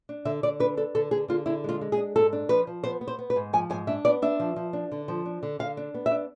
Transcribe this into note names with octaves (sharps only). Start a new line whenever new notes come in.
D4
D3 E5
D3 D5
D4 B4
D4 A4
D3 A4
D3 G#4
D3 F4
D3 E4
G#3 F4
G#3
G#4
D4
G#2 A4
D4
F3 B4
F3
B3 C5
B3
C5
B3
B4
G#2
F3 G#5
G#2 G#5
D4 E5
B3 D5
D4 E5
F3
F3
D4
D3
F3
D4
D3
D3 F5
D4
B3
E5
D4